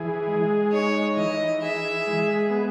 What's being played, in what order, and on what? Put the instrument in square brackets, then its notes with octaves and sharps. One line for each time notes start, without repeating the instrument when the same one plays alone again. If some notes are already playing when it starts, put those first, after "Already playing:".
Already playing: [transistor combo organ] E3 G#4
G#3
[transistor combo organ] D#4 [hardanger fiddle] C#5
[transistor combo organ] E3 [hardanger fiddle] D#5
[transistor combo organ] G#4 [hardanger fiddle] E5
[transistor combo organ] G#3
B3